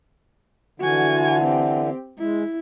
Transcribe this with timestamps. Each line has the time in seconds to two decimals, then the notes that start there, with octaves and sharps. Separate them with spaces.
0.80 D3 E3 F#4 G#5
1.44 C4 G4
2.19 G#3 E4